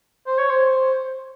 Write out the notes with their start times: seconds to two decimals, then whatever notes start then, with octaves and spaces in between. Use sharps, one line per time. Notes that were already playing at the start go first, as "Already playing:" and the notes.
0.27 C5
0.39 C#5
0.50 C5